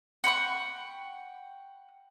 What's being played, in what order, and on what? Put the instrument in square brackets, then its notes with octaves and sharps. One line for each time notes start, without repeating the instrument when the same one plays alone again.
[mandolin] F#5 G5 B5 C#6